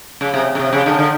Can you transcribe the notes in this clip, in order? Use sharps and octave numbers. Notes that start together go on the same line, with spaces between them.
C#3
C3
C#3
C3
C#3
D3
D3